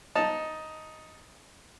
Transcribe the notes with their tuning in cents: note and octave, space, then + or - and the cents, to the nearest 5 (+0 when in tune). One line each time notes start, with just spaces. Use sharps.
D#4 +5 A5 +0